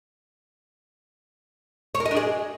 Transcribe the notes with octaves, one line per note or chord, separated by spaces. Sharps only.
C#5
A#4
D#5
D4
G#4